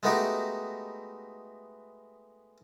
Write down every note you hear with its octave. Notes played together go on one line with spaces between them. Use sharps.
G#3 A3 B3 D#4 F#4 G4